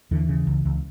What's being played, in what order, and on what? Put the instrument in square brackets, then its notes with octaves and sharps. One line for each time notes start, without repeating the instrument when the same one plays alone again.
[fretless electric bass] D#2 D3 E3
C#3
C#2
C#2